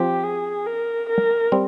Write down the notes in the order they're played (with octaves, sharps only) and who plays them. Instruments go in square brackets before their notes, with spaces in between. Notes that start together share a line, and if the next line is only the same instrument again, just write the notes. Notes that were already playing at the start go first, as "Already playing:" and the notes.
Already playing: [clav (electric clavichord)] F3 C4 [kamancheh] G4
[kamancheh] G#4
A#4
A#4
[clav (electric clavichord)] G3 C4